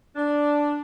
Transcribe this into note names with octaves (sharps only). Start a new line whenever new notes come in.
D4